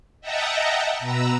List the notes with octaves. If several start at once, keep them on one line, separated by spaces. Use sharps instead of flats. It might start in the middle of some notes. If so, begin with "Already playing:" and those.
D#5 E5 F#5 G5 A5 A#5
B2 B4 A#5 E6